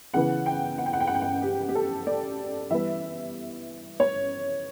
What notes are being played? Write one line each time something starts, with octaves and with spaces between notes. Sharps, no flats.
C#3 E3 B3 F#5
G5
F#5
G5
F#5
G5
F#5
G5
F#5
G4
G4
A4
D5
E3 G3 B3 E5
C#5